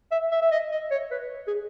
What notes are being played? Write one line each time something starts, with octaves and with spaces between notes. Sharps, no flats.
E5
E5
E5
D#5
D#5
C#5
B4
G#4